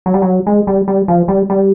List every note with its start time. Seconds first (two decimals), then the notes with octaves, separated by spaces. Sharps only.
0.06 F#3
0.14 G3
0.22 F#3
0.46 G#3
0.67 G3
0.88 G3
1.08 F3
1.28 G3
1.50 G3